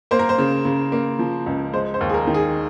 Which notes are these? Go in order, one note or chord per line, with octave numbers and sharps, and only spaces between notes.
A#3 C5
A#4
C5
C#3
C#3
A#3
F3
C#2
G#3 C5
C5
D#2
G#4
A#4
D#3
G#4